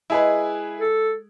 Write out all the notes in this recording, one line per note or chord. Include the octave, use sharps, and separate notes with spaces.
G#3 E4 G#4 B4
A4